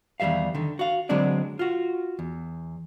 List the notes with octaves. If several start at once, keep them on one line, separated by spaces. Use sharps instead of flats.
E2 D#3 G3 E5 F5
D3 D#3
F#4 F5
D3 F#3 G#3 C4 D4 D5
F4 F#4
E2